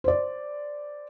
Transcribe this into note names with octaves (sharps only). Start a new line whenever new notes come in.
C5 D5